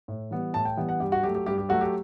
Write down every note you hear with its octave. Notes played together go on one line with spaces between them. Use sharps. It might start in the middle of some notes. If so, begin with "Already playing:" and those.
A2
E3 G3 B3
A2 A5
G5
E3 G3 B3
F#5
G2 G4
F#4
F#3 A3 G4
G4
G2 G4
G4
F#3 A3 F#4
G4